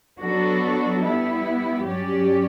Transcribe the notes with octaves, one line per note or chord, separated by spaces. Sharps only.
F#3 B3 D4 F#4 A4
G3 B3 E4
G2 F#3 C#4 G4 D5